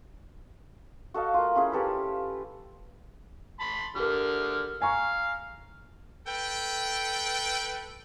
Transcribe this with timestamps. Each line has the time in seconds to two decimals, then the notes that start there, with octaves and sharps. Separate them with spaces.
1.14 F#4 A4 D#5 F5
1.34 A#3 F4
1.55 C#4 E4 F4 G#4
1.72 C#4 G4 A4 B4
3.60 A5 B5 C6
3.96 D3 G4 A#4 F6
4.82 F5 G#5 A#5 C#6
6.27 A4 B4 G5